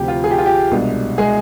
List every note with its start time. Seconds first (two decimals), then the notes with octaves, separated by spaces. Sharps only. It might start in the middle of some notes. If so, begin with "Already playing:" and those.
Already playing: D2 C3 F3 G4
0.08 F4
0.24 G#4
0.31 G4
0.38 F4
0.46 G4
0.71 C2 B2 G#3 D4
1.18 G#3 G#4